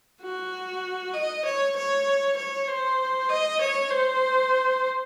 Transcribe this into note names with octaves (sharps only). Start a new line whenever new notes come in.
F#4
D#5
C#5
C#5
C#5
C5
D#5
C#5
C5